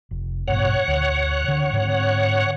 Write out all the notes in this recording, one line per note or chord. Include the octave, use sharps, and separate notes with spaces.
F1
A1 G2 B2 C#5 F#5
D2
D3
G#2 D3 C4